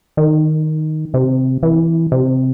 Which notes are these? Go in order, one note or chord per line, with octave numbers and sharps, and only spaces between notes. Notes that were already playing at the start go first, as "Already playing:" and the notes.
D#3
C3
E3
C3